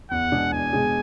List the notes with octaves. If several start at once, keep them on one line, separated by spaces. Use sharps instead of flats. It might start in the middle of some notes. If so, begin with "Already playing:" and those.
E2 F#5
B2 G#3 D4 G#4
E2 G#5
B2 G#3 D4 G#4